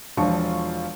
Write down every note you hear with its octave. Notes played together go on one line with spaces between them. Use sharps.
E1 F3 D4 F4 C#6